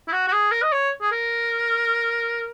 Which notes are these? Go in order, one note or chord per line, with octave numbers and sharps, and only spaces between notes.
E4
F#4
F#4
G#4
A#4
D#5
C#5
G#4
A#4